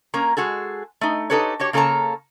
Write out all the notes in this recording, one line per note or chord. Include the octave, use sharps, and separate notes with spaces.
A#3 C#4 A#4 A#5
G#3 F#4 G#4 A4
A3 D#4
D#4 G4 A4 B4 C#5
F#4 G4 C#5
C#3 A#3 A4 C#5 A5 A#5